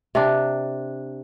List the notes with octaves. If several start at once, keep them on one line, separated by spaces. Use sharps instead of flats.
C3 D4